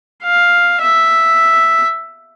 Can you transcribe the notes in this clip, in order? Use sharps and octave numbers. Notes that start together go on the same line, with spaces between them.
F5
E5